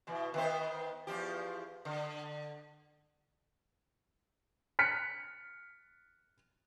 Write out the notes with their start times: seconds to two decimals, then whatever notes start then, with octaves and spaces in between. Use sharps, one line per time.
0.07 B2 E3
0.34 D#3 B3 C5
1.07 E2 F3 G4
1.85 D3
4.79 F6 F#6 B6 C#7